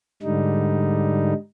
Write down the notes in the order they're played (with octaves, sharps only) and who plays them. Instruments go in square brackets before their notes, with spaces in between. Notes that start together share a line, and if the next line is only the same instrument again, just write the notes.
[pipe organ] G#2 D3 G3 D#4